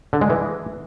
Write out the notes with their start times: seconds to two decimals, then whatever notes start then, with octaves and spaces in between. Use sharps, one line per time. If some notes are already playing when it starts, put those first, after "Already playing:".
0.13 D3
0.21 G#3
0.30 E3